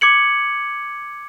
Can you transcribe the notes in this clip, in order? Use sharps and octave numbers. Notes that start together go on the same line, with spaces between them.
D6 G#6 C#7 F#7